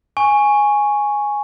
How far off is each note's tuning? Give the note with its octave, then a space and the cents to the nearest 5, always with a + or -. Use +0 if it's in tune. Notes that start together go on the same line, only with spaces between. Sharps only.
G#5 +0 C#6 +0